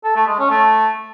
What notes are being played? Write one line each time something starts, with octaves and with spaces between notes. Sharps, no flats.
A4
A3
G#3
C#4
A3